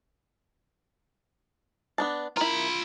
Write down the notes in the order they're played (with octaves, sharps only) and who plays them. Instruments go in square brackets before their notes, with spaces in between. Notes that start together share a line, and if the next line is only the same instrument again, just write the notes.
[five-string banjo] B3 D4 A5
[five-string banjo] E4 A#4 [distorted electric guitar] F4 B5